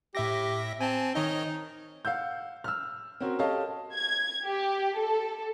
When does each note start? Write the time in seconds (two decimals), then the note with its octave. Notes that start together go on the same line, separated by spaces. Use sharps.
0.15 A2 G4 E5 A#6
0.81 C4 G#5 A5
1.15 D#3 D#4 C#5 D#5
2.05 F5 F#5 E6 G6
2.64 E6 F6
3.20 C4 C#4 F#4 A#4
3.39 G4 A4 C#5 D#5 F5 A5
3.94 G#6
4.46 G4
4.97 A4